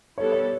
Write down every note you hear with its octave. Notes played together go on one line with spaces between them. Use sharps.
G3 B3 E4 A4 C#5
C#5